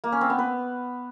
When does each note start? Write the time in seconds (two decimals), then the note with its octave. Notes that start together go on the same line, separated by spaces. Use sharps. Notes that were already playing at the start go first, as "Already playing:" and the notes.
0.04 A#3
0.12 C#4
0.21 C4
0.30 B3
0.39 B4